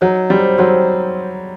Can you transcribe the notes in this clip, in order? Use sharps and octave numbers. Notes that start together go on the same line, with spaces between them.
F#3 D#4
G3 C4
F#3 C4